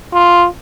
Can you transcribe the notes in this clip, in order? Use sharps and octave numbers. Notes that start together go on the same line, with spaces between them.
F4